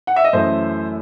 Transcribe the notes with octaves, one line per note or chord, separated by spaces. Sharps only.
F#5
E5
D#5
F#2 E3 A3 C5